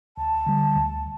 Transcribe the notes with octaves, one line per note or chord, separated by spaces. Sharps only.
D2 A5
D3 G3
D2